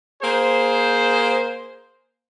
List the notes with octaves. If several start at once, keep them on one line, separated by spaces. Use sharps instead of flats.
A#3 G#4 C5